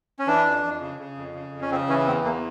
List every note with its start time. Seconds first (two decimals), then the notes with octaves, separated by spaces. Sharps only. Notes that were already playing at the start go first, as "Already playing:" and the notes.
0.19 C#4
0.27 E3 D4
0.45 F2
0.64 F2
0.81 C#3
0.99 C#3
1.17 F2
1.35 C#3
1.52 F2
1.61 C#4
1.71 C#3 C4
1.89 E3 C#4
2.07 E2 C4
2.24 E2 A#3